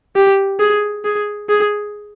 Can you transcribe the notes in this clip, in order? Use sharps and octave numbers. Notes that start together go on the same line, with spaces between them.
G4
G#4
G#4
G#4